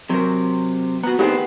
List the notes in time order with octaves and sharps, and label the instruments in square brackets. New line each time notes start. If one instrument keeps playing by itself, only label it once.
[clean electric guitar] C3 [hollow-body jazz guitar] F#3 A#4
[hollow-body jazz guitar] B3 F#4 [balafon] A#5
[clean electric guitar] A2 D#3 C4 [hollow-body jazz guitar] B3 G#4 F#5 [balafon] G4